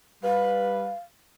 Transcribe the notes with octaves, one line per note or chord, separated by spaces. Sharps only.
G3 B4 F5